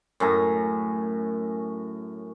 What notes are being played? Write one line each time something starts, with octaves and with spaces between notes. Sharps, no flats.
F#2 A2 G#5 A#5